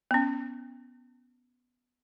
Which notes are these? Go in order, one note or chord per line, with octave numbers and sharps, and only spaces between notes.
B3 C#4